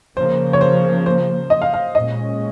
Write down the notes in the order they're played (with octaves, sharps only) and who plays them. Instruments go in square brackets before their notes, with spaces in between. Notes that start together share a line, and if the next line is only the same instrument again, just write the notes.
[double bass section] C#3 F3 A#3 [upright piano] C5
[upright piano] C#5
C5
C5
D#5
F5
F5
[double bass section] A#2 G#3 C#4 [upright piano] D#5